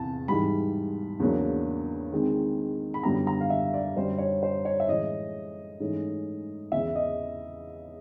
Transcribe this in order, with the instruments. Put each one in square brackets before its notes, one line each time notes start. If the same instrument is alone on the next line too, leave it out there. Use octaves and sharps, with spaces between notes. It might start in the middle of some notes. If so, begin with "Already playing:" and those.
Already playing: [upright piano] E2 C3 E3 A5
G#2 E3 G3 B5
E2 C#3 F#3 A#3 D4
D#3 G#3 C4
B5
F#2 D3 G3 B3 E4 A#5
A#5
F5
E5
D5
F#2 D3 G3 C5
C#5
C5
C#5
E5
A2 E3 G#3 C#4 D#5
G#2 E3 A3 C#4
E2 C#3 E3 E5
D#5